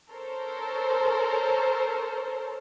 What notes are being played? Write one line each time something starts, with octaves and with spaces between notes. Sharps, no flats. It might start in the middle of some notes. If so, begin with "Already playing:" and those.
A4 A#4 C5 C#5